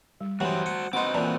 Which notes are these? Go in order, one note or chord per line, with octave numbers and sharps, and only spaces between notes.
G3
G2 E3 F#3 F#4 C5
F#5
C4 D#4 F#4 B4 F#5 C6 D6
A#2 E3 D5 A5 A#5